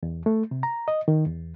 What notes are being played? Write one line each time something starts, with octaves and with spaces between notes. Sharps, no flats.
E2
A3
C3
A#5
D#5
D#3
E2